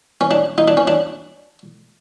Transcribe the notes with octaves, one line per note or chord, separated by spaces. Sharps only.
C#4
D4
D#4
D4
C#4
D4